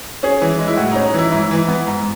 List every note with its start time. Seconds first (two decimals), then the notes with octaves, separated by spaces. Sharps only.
0.23 C#4 G#4
0.42 E3
0.59 G#3
0.68 E4
0.77 A2 F#4
0.92 C#4 D#4
1.06 D#4
1.14 E3 E4
1.32 G#2 E4
1.51 E3
1.68 B3
1.87 G#2